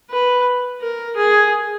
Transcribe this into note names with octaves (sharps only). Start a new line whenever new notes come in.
B4
A#4
G#4